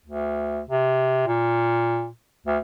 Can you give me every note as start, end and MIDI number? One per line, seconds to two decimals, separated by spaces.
0.06 0.60 38
0.70 1.26 48
1.27 2.07 46
2.46 2.58 38